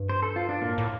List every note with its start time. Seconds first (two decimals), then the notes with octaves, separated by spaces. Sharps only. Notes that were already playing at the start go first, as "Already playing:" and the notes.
Already playing: G2
0.09 C5
0.23 A4
0.36 F4
0.49 D4
0.62 A2 A#3
0.78 A2